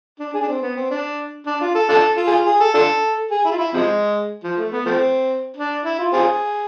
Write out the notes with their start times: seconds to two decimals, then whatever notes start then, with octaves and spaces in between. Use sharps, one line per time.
0.19 D4
0.34 G#4
0.41 D4
0.48 C4
0.62 B3
0.76 C4
0.90 D4
1.46 D4
1.61 F4
1.75 A4
1.89 D4 F4 A4
2.17 F4
2.27 G#4
2.32 F4
2.46 G#4
2.60 A4
2.74 D4 F4 A4
3.31 G#4
3.45 E4
3.52 F4
3.58 E4
3.73 C3 F3 G#3
4.44 F3
4.57 A3
4.72 B3
4.85 F3 A3 C4
5.56 D4
5.85 E4
5.99 F4
6.13 C4 F4 G#4